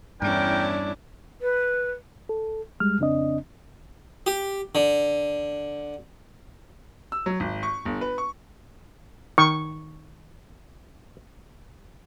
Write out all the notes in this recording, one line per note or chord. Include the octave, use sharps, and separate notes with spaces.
E2 G2 C#4 D4 E4 A#4 G5
B4
A4
G3 G#3 F6
F2 C#3 C4 D4 D#5
G4
D3
E6
F#3
G#1
C#6
G1
B4
C#6
D#3 C#6